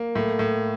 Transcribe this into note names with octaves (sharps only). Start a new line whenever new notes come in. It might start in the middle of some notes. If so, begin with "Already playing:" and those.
Already playing: A#3
A2
A2